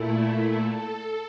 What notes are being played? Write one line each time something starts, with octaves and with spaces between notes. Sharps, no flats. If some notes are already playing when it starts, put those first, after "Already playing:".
Already playing: A#2 A3 E4
A4